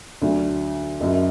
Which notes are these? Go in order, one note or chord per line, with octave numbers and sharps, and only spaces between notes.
D2 D3 F#3
F#1 F#2 F#3